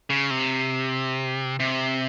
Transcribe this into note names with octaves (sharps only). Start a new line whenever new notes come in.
C#3
C3
C3